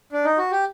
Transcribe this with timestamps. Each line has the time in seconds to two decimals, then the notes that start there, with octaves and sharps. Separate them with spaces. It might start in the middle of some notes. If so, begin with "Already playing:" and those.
0.12 D4
0.25 D#4
0.38 F#4
0.52 G4